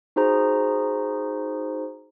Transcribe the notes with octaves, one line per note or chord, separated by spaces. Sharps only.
D#4 F#4 G#4 C5 A#5